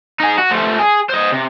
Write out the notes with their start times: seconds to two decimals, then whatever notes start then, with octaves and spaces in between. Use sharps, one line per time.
0.20 D#4 G#4
0.38 F#4
0.51 F3 A3
0.79 G#4
1.09 C5 D#5
1.32 C3